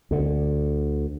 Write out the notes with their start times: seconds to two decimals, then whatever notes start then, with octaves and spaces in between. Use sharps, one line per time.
0.11 D2 D3